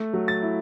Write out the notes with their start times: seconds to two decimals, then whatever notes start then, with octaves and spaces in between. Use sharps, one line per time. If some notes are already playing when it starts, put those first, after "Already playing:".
Already playing: A3
0.13 F#3
0.28 A6
0.42 E4